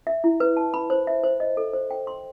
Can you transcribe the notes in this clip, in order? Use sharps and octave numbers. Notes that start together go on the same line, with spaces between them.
E5
E4
B4
A5
B5
C5
E5
C5
D#5
A4
C5
G5
C6